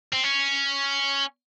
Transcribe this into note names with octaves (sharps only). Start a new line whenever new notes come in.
C4
C#4